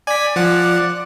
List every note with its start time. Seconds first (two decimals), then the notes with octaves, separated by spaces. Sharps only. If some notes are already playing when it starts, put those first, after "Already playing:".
0.07 D5 G#5 B6
0.36 F3 F#5